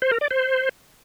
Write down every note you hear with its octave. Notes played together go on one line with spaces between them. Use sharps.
C5
A#4
D5
C5